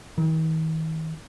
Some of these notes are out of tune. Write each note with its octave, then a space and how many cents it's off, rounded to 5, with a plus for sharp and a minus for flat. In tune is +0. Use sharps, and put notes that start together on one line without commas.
D#3 +45